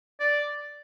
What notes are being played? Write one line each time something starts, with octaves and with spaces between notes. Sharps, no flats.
D5